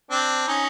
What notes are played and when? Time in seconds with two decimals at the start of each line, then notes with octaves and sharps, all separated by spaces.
0.11 C4 D4
0.48 C#4 D#4